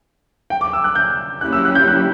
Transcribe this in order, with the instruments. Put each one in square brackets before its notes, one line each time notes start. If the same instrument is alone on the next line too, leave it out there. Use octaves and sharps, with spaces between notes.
[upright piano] G5
D6
E6
F#6
G6
[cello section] F#3 A#3 C#4 E4 G4 [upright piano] F#6
[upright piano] E6
F#6
G6
F#6